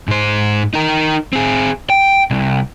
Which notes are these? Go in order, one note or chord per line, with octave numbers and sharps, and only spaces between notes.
G#2 C5
D#4 A#4
C4 G#4
G5
C2